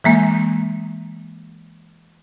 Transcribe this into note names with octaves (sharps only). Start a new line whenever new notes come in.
E3 G#3 A#3